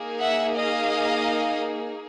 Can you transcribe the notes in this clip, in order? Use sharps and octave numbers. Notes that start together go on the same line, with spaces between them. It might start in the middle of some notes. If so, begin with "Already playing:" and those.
Already playing: A#3 D#4 G#4
E5 F#5
D#5 F5